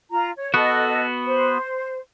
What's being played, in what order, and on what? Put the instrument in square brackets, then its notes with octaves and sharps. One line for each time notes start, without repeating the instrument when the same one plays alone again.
[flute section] F4 A#5
C#5
[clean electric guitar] B3 F#4 [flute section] A4 D#5
[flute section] C5